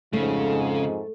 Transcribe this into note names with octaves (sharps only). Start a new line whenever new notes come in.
F2 G#2 C#3 A3